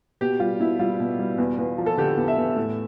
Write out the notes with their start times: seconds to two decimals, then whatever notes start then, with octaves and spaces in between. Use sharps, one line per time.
0.21 B2 G4
0.40 G3 F4
0.59 B2 E4
0.79 G3 F4
1.00 B2
1.19 G3
1.38 E2
1.58 E2
1.78 F3
1.86 A4
1.97 D3 G4
2.17 E2
2.28 E5
2.37 E2
2.56 A2